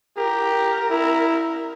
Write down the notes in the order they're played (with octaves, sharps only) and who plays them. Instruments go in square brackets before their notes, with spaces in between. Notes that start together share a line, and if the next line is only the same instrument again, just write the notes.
[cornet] G4 [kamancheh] A#4
[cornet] E4